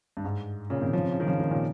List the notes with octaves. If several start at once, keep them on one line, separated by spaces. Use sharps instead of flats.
G2
G#2
A#2 C#3
C3 D#3
C#3 F3
C3
C#3
D#3
C#3 F3
C3 D#3
A#2 C#3